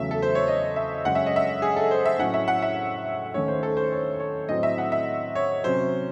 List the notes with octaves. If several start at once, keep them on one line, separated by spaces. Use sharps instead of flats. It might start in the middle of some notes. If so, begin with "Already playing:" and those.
Already playing: E2 C#3 F#3 A3 E5
A4
C5
C#5
D#5
E5
F#2 C#3 G#3 C#4 F#5
E5
D#5
E5
G#4
A4
C5
E5
A2 F#3 A3 C#4 F#5
E5
F#5
E5
D#2 D#3 A3 C#4 C#5
C5
A4
C5
C#5
C#5
A2 F#3 C4 D#5
E5
F#5
E5
C#5
C3 F#3 C#4 C5